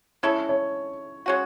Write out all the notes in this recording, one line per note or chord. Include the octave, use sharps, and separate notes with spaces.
G#3 C#4 E4 A4 C#5
C#5
G#3 C#4 F#4